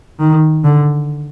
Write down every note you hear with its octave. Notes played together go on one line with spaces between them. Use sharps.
D#3
D3